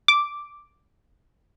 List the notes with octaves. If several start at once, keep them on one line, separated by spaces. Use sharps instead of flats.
D6